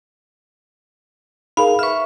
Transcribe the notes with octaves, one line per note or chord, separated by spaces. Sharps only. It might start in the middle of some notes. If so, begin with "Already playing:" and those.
D#4 G#4 A#4 F5 B5
B4 E5 C#6 F6